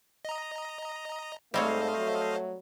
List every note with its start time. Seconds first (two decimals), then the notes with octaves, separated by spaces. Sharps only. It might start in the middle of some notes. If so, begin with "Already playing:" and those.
0.25 D#5 A#5
1.54 G#2 G3 A3 C4 C5 C#5 D#5 F5
1.98 F#3